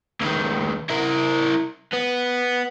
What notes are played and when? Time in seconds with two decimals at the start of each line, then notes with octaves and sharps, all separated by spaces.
0.21 C#2 D#3
0.90 E4 A#4
1.93 B3